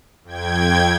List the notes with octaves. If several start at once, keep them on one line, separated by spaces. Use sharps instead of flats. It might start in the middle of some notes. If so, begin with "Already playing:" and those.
F2 G5 G#6